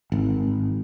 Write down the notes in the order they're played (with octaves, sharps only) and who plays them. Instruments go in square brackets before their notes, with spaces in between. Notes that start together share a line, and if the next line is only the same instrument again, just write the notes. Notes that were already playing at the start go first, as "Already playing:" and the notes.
[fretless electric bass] G#1